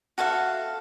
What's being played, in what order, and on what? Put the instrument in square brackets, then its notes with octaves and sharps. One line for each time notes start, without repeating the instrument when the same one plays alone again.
[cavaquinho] F#4 A4 E5 F5